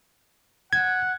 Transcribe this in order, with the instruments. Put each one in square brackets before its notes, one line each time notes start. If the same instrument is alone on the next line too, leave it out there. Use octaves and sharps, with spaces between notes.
[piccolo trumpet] F#5 [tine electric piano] G#6